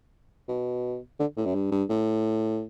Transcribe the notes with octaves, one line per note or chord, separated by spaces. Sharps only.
B2
D3
A2
F#2
G2
G2
A2